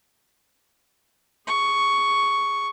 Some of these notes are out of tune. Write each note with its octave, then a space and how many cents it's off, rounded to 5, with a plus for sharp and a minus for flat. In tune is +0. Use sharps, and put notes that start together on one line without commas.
G#4 +0 C#6 +5